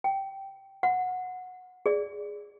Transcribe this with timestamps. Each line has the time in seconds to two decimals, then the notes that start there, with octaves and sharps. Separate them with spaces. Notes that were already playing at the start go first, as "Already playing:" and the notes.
0.04 G5
0.83 F#5
1.86 G#4 D5